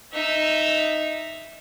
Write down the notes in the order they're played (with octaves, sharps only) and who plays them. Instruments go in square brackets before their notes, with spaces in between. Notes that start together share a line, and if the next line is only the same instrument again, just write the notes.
[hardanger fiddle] D#4 E5